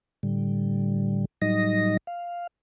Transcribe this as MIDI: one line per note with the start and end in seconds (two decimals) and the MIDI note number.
0.23 1.25 45
0.23 1.25 50
0.23 1.25 55
1.42 1.97 45
1.42 1.97 54
1.42 1.97 55
1.42 1.97 63
1.42 1.97 75
1.42 1.97 94
2.07 2.47 77